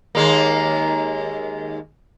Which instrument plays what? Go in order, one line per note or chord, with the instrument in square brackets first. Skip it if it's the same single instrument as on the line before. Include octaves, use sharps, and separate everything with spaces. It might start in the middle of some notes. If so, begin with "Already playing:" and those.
[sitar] D#2 G#3 A#3